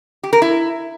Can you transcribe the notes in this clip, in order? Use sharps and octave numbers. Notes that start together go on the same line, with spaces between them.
G4
A#4
E4